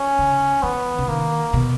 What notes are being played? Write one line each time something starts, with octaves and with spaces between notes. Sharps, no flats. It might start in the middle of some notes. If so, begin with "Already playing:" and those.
Already playing: C#4
C#3
E3 B3
C#3
D#3 A#3
B2